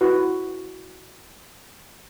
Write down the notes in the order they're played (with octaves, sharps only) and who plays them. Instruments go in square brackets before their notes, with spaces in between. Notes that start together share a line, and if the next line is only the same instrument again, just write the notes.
[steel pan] E4 F#4 B4